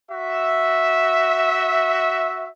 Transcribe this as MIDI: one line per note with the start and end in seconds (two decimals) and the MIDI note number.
0.11 2.48 66
0.11 2.48 76